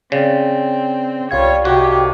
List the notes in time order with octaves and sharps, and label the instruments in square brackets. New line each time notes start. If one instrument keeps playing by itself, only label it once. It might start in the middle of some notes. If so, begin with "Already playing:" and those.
[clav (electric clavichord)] C#3 [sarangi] C4 [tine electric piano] D5 A6
[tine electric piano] C2 F5 G#6 [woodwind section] G3 F4 [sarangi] C#5
[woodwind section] D2 G#2 C3 [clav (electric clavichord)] F#4 [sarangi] G4